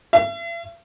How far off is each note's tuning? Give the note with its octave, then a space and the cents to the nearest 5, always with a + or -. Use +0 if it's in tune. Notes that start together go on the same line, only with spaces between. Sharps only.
E5 +45